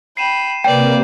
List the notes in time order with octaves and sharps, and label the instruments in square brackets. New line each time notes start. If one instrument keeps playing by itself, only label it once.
[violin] G5 B5 [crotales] C7 D#7 E7
[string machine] C3 A#3 [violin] B4 D5 [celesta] G5 [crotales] G6